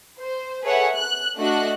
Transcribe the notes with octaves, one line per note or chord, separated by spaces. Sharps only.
C5
G#4 A4 B4 C#5 E5 F#5
F#6
A3 D4 F#4 D#5 F#6